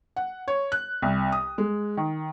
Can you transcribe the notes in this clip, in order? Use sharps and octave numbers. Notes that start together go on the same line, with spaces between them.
F#5
C#5
F#6
C2
D#6
G#3
D#3